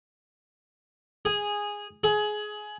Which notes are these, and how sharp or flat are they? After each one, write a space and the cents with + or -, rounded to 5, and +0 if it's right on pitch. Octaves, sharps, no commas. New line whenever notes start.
G#4 -10
G#4 +20